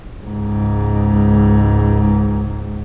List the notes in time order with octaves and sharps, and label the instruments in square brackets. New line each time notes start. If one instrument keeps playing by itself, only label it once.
[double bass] C#2 G#2